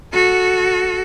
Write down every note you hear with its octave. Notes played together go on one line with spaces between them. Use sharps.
F#4 A4